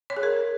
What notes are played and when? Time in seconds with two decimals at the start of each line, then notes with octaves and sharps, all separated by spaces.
0.10 C#5
0.17 G#4
0.23 A#4